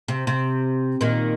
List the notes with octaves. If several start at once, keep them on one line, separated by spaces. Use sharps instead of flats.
C3
C3
A#2 D#3